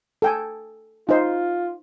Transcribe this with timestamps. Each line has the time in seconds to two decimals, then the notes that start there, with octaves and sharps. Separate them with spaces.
0.22 A4 G5 G#5
1.09 D#4 F4 C5